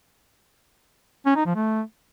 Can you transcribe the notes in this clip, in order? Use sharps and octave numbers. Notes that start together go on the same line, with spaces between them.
C#4
D#4
F3
A3